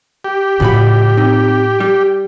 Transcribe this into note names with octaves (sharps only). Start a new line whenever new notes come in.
G4
A2 C#3 F4 F#4 B5
C4 D#4
G3